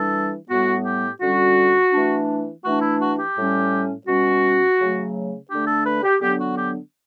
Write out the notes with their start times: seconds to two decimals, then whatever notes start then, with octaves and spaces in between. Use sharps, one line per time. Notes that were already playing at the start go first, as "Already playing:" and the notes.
Already playing: E3 G3 D4 A4
0.49 A2 G3 B3 F#4
0.85 G4
1.21 D3 G3 C#4 F#4
1.92 E3 A3 D4
2.63 E3 A3 D4 F#4
2.81 E4
3.00 F#4
3.18 G4
3.35 A2 G3 C#4
4.06 B2 G3 C#4 F#4
4.79 C#3 F#3 A3
5.49 D3 A3 D4 G4
5.67 A4
5.86 B4
6.03 G4
6.21 D3 F#3 B3 D4 G4
6.39 F#4
6.57 G4